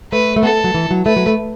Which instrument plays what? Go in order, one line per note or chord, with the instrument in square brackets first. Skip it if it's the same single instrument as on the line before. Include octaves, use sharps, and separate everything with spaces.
[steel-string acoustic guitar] A3 [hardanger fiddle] B4
[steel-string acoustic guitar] A3
[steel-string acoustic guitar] B3 [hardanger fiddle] A4
[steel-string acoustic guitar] F#3
E3
F#3
[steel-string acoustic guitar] A3 [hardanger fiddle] B4
[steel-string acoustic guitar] F#3
A3